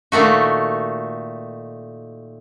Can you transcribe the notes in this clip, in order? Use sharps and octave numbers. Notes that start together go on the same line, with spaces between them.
A#2 D#3 A3 F#4